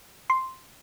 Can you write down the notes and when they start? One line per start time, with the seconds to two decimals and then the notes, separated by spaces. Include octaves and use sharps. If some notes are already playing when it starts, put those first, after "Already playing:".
0.30 C6